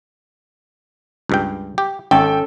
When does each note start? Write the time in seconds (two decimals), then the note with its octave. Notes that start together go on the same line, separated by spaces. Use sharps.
1.29 C#2 G2 G5
1.78 G4
2.11 G#1 C#4 A4 G5